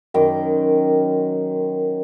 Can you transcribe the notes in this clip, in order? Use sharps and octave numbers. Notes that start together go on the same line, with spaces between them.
F#2 D#3 D6